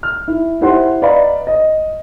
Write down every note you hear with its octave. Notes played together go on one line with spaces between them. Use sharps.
F6
E4
E4 G4 C5 F#5 C6
B4 D5 D#5 F5 A#5 B5
D#5